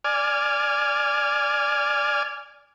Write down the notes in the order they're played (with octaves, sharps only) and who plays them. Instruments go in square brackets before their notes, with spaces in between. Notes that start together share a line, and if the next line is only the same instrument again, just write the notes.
[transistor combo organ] D5 G#5 F6